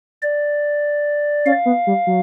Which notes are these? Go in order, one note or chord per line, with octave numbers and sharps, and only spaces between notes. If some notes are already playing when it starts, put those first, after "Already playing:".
D5
C#4 F5
B3
G3
F#3